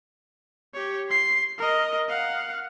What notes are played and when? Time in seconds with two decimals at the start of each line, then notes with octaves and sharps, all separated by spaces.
0.74 G4 C#5
1.09 C6 C7
1.58 A#4 D#5
2.09 F5 F#5